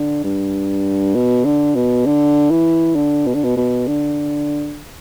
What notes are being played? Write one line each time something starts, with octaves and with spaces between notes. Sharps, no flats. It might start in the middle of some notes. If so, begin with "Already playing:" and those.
Already playing: D3
G2
B2
D3
B2
D3
E3
D3
B2
D3
B2
B2
D3